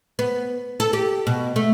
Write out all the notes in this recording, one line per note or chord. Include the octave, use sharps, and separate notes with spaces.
B3
A4
G4
B2
A3